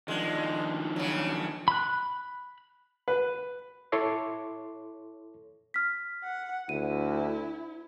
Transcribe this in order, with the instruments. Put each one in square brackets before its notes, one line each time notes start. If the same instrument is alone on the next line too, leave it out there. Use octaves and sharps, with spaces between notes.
[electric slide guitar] D#3 F3 D4 [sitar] G#3
[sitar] C#3 F#3
[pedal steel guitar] B5 F#6
[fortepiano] B4
[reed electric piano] E4 A4 C#5 C6 D6
[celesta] F6 B6
[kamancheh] F#5
[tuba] D2 [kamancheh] E4 [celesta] D#7